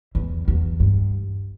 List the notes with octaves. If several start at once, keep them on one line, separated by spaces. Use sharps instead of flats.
E2
E2
G2